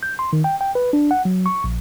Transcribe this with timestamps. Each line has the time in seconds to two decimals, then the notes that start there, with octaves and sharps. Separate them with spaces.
0.03 G6
0.19 C6
0.33 D#3
0.44 G5
0.61 G5
0.75 B4
0.93 D4
1.11 F#5
1.25 F#3
1.46 C#6
1.64 A#1